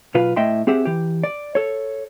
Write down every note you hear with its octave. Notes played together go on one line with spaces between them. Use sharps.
B1 B2 F4 B4 F5
A2 D#5 E5 G5 C6
C4 G4 G#4 E5 F#5
E3 G4
D5
A4 C#5